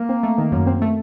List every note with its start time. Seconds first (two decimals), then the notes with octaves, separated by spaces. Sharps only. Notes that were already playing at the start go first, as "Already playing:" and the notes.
Already playing: A#3
0.09 C4
0.23 A3
0.38 D#3
0.52 F#2
0.67 C4
0.82 A3